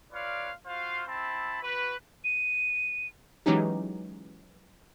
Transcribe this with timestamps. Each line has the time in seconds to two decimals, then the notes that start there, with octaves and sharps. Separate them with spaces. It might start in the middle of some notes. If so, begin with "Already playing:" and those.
0.12 F4 B4 C#5 D5 F5
0.66 F4 F#4 C5 F5
1.08 C4 E4 A5 B5
1.63 F#4 B4
2.24 D#7
3.46 E3 F#3 G#3 C#4 D#4 G4